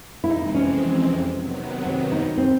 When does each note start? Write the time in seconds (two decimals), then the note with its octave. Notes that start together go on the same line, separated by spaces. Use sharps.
0.24 E4
0.29 F2 C3 E3 G#3 C4 D#4
0.55 C#4
1.34 C3 D#3 F#3 B3
1.86 C4
2.12 D#4
2.37 C4